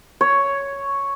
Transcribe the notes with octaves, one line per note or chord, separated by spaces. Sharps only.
C#5